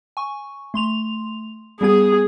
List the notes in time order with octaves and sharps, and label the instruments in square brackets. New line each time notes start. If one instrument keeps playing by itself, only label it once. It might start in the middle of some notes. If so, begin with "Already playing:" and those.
[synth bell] G#5 C#6
A3 C6 F7
[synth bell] G3 B3 G#6 [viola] G#4